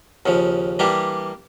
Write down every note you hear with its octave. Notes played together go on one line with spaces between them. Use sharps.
D#2 C#3 F3
E3 G3 A#3 D4 G4